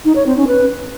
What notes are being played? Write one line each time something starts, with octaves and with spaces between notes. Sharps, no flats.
D#4
C#5
C4
C#4
B4